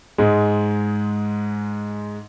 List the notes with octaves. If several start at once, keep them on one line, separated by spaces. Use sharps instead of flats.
G#2 G#3